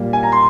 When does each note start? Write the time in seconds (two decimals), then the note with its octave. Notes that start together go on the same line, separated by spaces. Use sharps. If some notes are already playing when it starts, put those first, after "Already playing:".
Already playing: A#2 G3 A#3
0.13 G#5
0.23 A#5
0.32 C6